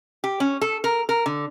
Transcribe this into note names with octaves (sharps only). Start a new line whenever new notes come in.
G4
C#4
A4
A#4
A#4
D3